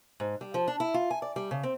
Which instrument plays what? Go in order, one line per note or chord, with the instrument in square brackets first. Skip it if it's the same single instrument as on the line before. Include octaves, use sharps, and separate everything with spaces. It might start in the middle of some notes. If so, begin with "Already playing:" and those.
[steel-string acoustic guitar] G#2
G3
F3
D4
E4
F4
G#5
D5
G3
C#3
C4